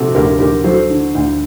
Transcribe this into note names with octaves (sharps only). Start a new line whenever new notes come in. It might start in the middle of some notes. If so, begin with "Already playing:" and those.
Already playing: C3 F#4 A4
D2 G4 A#4
D2 G4 A#4
F#3 A4 C5
D3
D2